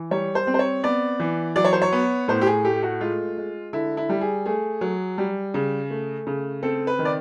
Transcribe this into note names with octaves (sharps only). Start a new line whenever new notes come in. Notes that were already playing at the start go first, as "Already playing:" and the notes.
Already playing: E3
G3 C#5
C5
C4
C5
C#5
B3 D5
E3
F#3 D5
C#5
C5
C#5
B3
A2 C5
G4
G#4
A3 G4
F#4
G#3 F4
G#3
D3 E4
E4
G3
G#4
A3 G#4
F#3
G3
C#3
A3
C#3
C4 A4
B4
D#3
D5